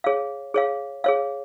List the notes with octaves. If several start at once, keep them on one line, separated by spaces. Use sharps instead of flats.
G#4 C#5 F5
G#4 C#5 F5
G#4 C#5 F5